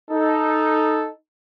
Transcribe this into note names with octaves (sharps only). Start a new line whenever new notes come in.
D#4 A4